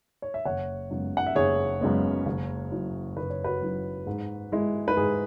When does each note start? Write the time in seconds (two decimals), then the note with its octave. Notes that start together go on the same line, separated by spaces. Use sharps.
0.22 C#5
0.34 E5
0.45 F#1 C#5 F#5
0.90 F#2 C#3 G#3 B3
1.17 F#5
1.27 E5
1.35 F#1 G#4 C#5
1.81 F#2 C#3 G#3 B3
2.26 F#1
2.72 F#2 F#3 E4
3.17 F#1 B4
3.30 C#5
3.44 F#4 B4
3.61 F#2 F#3 E4
4.07 G#2
4.52 G#3 E4
4.88 B4
4.97 G#2 G#4